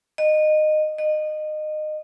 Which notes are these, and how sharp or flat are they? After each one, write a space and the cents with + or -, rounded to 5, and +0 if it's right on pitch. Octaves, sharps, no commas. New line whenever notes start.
D#5 -20
D#5 -25